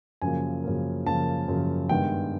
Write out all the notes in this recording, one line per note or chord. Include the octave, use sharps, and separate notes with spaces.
F#2 C#3 F3 A#3 G#5
F#2 C#3 F3 A#3
F#2 C#3 F3 A#3 A5
F#2 C#3 F3 A#3
G2 D#3 G#3 B3 G5